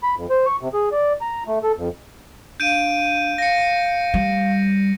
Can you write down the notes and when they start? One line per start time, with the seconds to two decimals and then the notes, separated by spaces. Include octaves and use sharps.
0.03 B5
0.16 F2
0.30 C5
0.46 C#6
0.61 C3
0.73 G#4
0.92 D5
1.21 A#5
1.47 A3
1.63 A4
1.76 F2
2.60 D4 F5 G6 D7 D#7
3.38 F5 A#6 C#7
4.14 G3